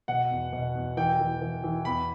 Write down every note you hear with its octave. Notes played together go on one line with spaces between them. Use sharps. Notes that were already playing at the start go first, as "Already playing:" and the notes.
B2 F#5
E2
B2
E2
E3 G5
E3
E3
E3
E2 B5